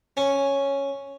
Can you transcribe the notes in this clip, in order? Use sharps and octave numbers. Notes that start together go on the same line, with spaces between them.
C#4